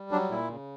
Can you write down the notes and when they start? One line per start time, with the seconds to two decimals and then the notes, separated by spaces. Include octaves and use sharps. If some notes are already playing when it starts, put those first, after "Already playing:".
Already playing: G3
0.11 F#3 D4
0.31 A#2 E4
0.51 C#3